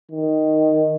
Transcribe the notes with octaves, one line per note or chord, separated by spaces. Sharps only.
D#3